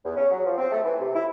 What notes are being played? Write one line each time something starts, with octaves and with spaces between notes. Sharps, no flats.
E2
C#4
F#3
F3
C4
A3
E3
C3
E4